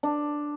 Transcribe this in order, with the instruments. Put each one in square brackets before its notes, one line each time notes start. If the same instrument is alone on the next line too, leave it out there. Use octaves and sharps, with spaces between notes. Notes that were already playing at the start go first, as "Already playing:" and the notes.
[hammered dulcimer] D4